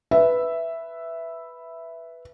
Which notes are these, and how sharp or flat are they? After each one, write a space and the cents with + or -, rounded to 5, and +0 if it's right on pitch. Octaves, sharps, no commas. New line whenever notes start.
B4 +0 E5 +0